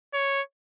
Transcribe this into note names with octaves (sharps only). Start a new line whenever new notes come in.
C#5